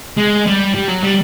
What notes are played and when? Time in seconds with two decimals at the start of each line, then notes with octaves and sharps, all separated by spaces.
0.18 G#3
0.47 G3
0.75 G3
0.88 F#3
1.03 G3